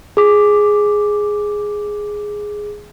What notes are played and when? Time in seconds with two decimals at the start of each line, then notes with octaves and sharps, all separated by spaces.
0.17 G#4 D6